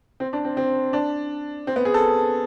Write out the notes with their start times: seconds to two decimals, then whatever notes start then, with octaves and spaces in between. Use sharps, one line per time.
0.20 C4
0.33 D4
0.45 C4
0.57 C4
0.93 D4
1.67 C4
1.76 B3
1.85 G#4
1.94 A4